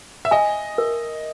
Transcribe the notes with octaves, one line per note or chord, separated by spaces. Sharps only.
E5
D#5 G#5
A#4